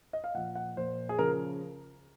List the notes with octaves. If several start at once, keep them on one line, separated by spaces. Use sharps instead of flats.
D#5
F5
A#2 F3 F#5
F#5
A#2 F3 C5
G#4
C#3 F3 A#4